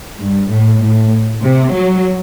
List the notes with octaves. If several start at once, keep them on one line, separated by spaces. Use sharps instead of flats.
G2
A2
A2
C3
F#3